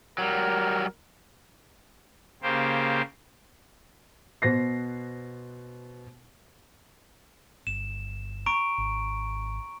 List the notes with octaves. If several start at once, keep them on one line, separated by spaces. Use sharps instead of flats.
F#3 G3 A#4
C#3 A#3 G4 C5
B2 C5 A#6 C7
G1 E7
A#5 C#6 D7
G#1